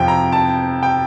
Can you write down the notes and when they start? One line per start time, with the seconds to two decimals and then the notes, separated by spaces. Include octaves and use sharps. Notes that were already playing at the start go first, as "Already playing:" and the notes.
Already playing: F2 C3 F3 G5
0.08 A#5
0.32 A5
0.83 G5